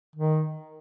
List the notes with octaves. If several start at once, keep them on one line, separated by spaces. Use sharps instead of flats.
D#3